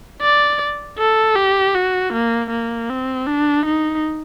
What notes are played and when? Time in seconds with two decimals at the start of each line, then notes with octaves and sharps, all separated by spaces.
0.22 D5
0.99 A4
1.36 G4
1.75 F#4
2.13 A#3
2.50 A#3
2.90 C4
3.27 D4
3.66 D#4